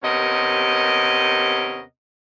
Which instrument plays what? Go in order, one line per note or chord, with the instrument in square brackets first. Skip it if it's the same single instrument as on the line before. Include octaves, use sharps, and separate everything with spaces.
[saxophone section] D#2 C3 B3 C#4 A#4 D#5